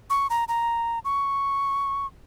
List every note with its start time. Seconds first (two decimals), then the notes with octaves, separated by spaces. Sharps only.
0.10 C#6
0.30 A#5
0.48 A#5
1.05 C#6